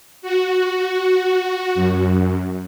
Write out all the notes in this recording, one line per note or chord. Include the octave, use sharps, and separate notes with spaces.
F#4
F#2